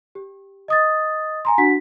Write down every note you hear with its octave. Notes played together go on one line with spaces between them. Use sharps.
G4
D#5 D#6 A6
G#5 A#5 C6
D4 F#4 F#5 B6